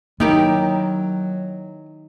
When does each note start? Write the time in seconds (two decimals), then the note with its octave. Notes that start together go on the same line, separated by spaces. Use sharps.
0.20 D#3 F#3 A#3 E4 G4 A#4